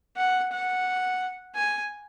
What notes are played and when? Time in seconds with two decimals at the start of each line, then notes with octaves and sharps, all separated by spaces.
0.17 F#5
0.52 F#5
1.55 G#5